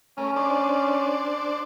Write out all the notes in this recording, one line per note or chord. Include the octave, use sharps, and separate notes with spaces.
A3 C#4 A#4
D4 C5 D5